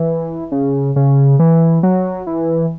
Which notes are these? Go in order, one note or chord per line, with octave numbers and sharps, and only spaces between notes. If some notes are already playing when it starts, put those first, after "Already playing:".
Already playing: E3
C#3
C#3
E3
F#3
E3